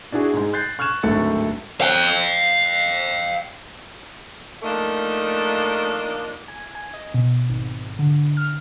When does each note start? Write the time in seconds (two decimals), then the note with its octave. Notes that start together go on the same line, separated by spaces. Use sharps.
0.12 D4 E4 F#4 G#4
0.33 G#2 G#3
0.53 F#6 G6 A6 C7
0.79 C#6 F6 F#6 G#6 E7
1.03 D1 G#1 D2 A4 A6 C#7
1.81 F5 G5
4.63 F3 A3 A#3 D4 D#4
6.48 G#5
6.75 G#5
6.94 D#5
7.14 B2
7.49 G#1
7.99 D3
8.37 F6